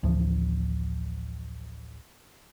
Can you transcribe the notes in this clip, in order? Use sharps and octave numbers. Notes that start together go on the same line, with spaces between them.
A1 D2 E3 F3